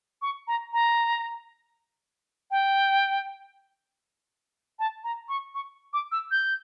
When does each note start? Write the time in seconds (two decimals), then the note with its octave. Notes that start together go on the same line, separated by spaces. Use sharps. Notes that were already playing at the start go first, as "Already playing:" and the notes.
0.22 C#6
0.48 A#5
0.73 A#5
2.51 G5
4.79 A5
5.04 A#5
5.29 C#6
5.55 C#6
5.93 D6
6.12 E6
6.31 G6